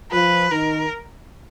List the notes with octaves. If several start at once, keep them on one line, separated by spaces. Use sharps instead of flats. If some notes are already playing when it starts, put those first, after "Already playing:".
F3 F4 B4
D#3 D#4 A#4